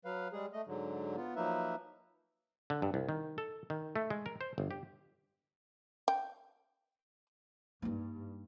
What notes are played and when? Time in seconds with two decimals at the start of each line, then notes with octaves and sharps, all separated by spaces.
0.05 F#3 B4 F5
0.33 G3 G#3 G#4
0.53 A3 D#5
0.67 G#2 D3 F#3
1.16 B3 F4
1.36 F3 F#3 A#3 D#4 B4 E5
2.70 D3
2.82 G2
2.94 C2
3.09 D#3
3.38 A4
3.70 D#3
3.96 A3
4.10 G#3
4.26 A#4
4.41 C5
4.58 G1
4.71 G4
6.08 G5
7.82 G2 A#3 D#4